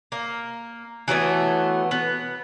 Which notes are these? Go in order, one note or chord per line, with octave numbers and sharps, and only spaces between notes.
A#3
E3 F#3 A3 B3
B3